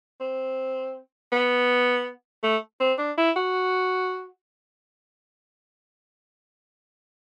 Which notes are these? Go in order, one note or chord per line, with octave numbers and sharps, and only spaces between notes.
C4
B3
A3
C4
D4
E4
F#4